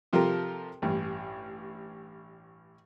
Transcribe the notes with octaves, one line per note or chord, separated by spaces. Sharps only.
C3 F3 F4 G4 A4 A#4
A1 G2